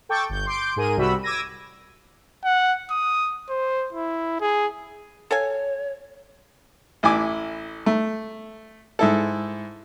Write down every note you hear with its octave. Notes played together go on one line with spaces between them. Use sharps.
A4 G5 C#6 D6 G6 A6
G1 G6
C6 D6 G6 D7
G#2 G#4 A#4 D#7
C2 C3 G3 F#4 B5 E6
D6 E6 G#6 A#6 D#7
F#5
D#6
C5
E4
G#4
A4 C#5 F5 G#5
A1 E4 G#5 D6
A3
G#2 E4 A4